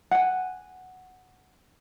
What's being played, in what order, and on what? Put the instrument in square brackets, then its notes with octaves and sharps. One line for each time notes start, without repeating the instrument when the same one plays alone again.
[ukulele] F#5 G#5